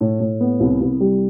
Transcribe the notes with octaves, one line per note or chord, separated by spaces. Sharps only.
A2
A2
B3
C2
C2
G3